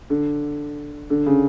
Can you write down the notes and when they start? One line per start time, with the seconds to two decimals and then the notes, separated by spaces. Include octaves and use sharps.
0.10 D3
1.10 D3
1.26 C#3